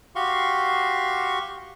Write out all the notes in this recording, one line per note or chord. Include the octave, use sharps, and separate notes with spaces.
F#4 G4 F5 C6 C#6